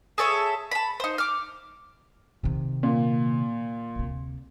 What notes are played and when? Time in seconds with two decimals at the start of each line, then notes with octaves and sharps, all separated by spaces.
0.18 G#4 A4 C#5 E5
0.71 A5 B5
1.00 D#4 C5
1.18 D6 F6
2.44 C3 D#3
2.83 A#2
3.95 D2 C3